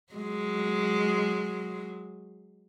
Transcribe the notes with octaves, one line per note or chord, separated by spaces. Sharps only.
F#3 G#3